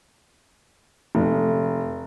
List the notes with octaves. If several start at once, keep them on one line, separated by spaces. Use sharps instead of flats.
F1